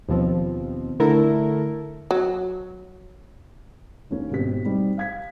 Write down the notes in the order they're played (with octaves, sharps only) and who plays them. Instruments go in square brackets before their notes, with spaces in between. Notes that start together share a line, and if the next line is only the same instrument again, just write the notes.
[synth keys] D#2 B2 F3 C4
D3 A3 E4 A4 A#4
[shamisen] F#3
[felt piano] D#2 C#4
G#1 B2 G4 B6
G3 C4 D#4
F5 G#6 B6